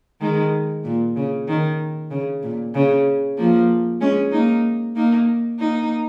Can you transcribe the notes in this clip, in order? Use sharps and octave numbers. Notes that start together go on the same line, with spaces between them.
D#3 G#3
A#2
C#3
D#3
C#3
A#2
C#3
F3 A#3
G#3 C#4
A#3 D#4
A#3 D#4
A#3 D#4